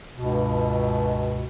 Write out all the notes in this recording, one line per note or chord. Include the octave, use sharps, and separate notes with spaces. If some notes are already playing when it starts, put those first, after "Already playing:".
C#2 G2 B2